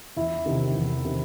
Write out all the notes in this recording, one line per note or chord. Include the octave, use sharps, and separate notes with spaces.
E2 E4
C3 D#3
E2
C3 D#3